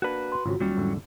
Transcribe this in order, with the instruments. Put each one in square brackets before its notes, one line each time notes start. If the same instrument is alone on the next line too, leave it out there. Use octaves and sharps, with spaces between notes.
[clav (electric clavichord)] A#3 D4 [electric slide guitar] F#4 B4
[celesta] C6
[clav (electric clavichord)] G#1 C#3 C4 [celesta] F4 F#4
[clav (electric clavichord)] D#2 [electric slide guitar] F#3 G3 C#4
[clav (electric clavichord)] E2 G#2 D3